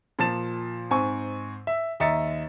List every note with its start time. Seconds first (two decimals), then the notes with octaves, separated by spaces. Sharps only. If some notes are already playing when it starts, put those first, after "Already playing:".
0.19 A#2 F3 A5 A6 E7
0.91 G#2 C4 G#5 C#6
1.67 E5
2.00 D#2 D#5 E5 A#5 A6 C#7